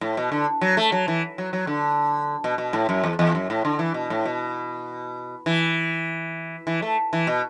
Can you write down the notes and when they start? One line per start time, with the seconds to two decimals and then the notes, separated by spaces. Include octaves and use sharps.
0.01 A2
0.17 B2
0.32 D3
0.61 F#3
0.77 A3
0.92 F#3
1.08 E3
1.38 F#3
1.53 F#3
1.67 D3
2.44 B2
2.58 B2
2.73 A2
2.89 F#2
3.04 E2
3.19 E2
3.35 F#2
3.50 A2
3.65 D3
3.79 E3
3.94 B2
4.10 A2
4.25 B2
5.46 E3
6.67 E3
6.82 A3
7.13 E3
7.27 B2